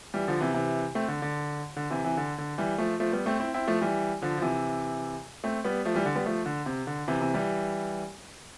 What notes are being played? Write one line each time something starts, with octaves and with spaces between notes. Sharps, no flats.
E3 G3
D3 F3
C3 E3
C3 E3
A3 C4
D3
D3
D3
C3 E3
C3 E3
D3
D3
E3 G3
F3 A3
F3 A3
G3 B3
A3 C4
C4 E4
C4 E4
F3 A3
E3 G3
D3 F3
F3
C3 E3
A3 C4
G3 B3
F3 A3
E3 G3
D3
G3 B3
F3 A3
D3
C3
D3
C3 E3
C3 E3
E3 G3